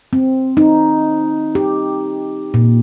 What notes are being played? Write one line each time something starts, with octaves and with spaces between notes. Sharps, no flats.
C4
D#4
G4
A#2